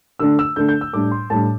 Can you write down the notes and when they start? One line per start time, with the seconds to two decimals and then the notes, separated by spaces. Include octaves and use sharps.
0.19 D3 A3 D4 E6
0.39 E6
0.56 D3 A3 D4 G6
0.68 G6
0.81 E6
0.93 A2 G3 D4 D6
1.11 C6
1.30 A2 G3 D4 A5